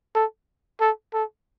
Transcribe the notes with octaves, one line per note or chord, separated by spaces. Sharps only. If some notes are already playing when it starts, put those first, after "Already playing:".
A4
A4
A4